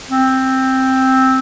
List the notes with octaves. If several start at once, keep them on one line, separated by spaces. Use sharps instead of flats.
C4